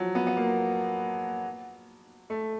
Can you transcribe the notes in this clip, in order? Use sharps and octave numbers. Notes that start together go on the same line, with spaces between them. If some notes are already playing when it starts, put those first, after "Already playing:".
Already playing: F3 F#3
B3
B3
A#3
A3